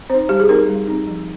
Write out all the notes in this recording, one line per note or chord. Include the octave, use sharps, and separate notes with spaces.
C4 D#4 C5
G3 G4
G#4
C4 D#4 A#4
G3
C4 D#4
F3